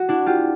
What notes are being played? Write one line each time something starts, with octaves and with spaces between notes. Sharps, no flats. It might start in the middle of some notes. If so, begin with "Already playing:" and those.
Already playing: F#4
D4 E4
F4 G4